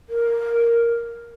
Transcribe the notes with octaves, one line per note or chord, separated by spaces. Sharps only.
A#4